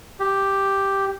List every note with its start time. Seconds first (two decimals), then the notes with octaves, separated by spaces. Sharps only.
0.20 G4